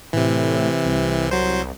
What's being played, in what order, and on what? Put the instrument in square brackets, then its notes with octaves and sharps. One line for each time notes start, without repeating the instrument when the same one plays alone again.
[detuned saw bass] A2 [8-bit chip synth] C3 E3
[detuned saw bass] C2
[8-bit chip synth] F#3 C5